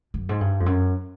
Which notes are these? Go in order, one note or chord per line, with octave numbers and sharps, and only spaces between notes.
F#2
G#2
G2
F2
F#2